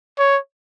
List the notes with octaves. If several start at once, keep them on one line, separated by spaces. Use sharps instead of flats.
C#5